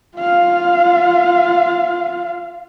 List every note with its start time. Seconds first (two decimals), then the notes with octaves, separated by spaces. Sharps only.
0.17 F4 F5